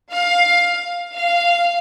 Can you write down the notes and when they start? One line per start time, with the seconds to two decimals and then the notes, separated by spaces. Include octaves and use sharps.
0.11 F5
1.15 F5